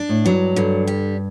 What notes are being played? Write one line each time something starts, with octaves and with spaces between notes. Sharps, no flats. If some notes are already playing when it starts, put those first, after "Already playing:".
Already playing: D4
A2
G2 F#3
G2 D3
G3